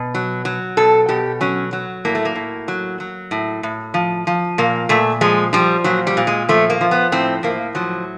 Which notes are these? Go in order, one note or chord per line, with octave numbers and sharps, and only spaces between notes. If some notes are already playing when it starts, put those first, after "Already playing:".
Already playing: B2
F#3
F#3
B2 A4
B2 G4
F#3 C#4
F#3
A2 A#3
A3
A#3
A2
F#3
F#3
A2
A2
F3
F3
A#2 A#3
A#2 A3
F3 G#3
F3 G3
A#2 F#3
G3
A#2
G#3
F3 A3
A#3
F3
B3
A2 C4
A2 A#3
F3 F#3